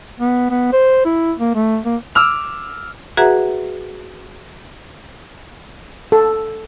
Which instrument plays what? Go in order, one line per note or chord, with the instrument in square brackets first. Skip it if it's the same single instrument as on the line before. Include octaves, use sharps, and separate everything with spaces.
[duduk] B3
B3
C5
E4
A#3
A3
A#3
[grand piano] D6 E6 F6 F7
[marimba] F#4 G#4 B4 E5 F#5 A#5
[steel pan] A4